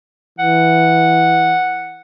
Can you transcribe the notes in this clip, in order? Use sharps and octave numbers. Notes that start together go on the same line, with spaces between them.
E3 F#5